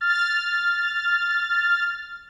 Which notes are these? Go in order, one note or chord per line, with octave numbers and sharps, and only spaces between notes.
F6 A6